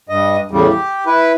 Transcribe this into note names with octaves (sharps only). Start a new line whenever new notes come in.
G2 D#5
E2 A2 C#3 G3
G4
E4 B4